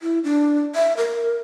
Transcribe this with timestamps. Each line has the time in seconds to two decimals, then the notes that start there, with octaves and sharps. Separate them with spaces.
0.01 E4
0.24 D4
0.75 E5
0.97 A#4